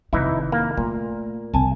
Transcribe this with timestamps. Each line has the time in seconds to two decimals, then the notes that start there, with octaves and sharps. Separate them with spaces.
0.13 F1 D#3 E3 D#4 E4
0.52 A#3
0.77 A#2 A3
1.54 C2 C4 G#5 A5